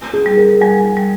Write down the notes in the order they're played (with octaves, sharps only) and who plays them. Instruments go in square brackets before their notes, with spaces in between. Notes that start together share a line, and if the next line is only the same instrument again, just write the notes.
[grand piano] G#4
[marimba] G3
[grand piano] A#4
[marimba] G3 [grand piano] G#5
[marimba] G3